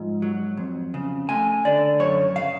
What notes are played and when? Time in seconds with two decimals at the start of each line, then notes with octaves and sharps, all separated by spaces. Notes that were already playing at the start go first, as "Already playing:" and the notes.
Already playing: G#2 F3
0.22 F#3
0.57 F2
0.94 C#3
1.29 A3 G#5
1.65 D3 D5
2.00 F#2 C#5
2.35 C#3 F5